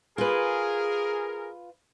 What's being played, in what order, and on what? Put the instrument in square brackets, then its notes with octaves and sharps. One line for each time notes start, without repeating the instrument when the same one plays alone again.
[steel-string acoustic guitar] F4 B4 [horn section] G#4 A#4